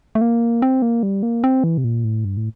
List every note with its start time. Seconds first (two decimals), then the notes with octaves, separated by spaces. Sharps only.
0.15 A3
0.21 A#3
0.62 C4
0.82 A#3
1.03 G3
1.23 A#3
1.44 C4
1.64 E3
1.78 C3
1.84 A#2
2.04 A2
2.25 G2
2.37 A2